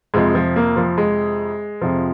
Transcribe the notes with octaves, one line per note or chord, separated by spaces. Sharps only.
F2 C3 F3 G#3
F3
A#3
F3
G#3
F2 C3 F3